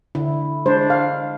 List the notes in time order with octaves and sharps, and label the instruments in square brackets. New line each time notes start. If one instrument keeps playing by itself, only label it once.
[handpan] D3 E4
[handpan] G#3 [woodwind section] D4 [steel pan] C5
[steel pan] F5